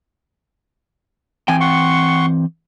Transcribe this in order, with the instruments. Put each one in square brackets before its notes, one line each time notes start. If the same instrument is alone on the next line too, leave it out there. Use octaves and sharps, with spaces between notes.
[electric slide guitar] E3 C4 G5 [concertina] G#5
[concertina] F#5 C6 C#6